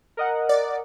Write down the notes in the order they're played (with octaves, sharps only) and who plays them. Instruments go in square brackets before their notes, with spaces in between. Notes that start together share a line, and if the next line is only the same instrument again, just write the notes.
[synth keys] A#4 D#5 F#5
[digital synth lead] D5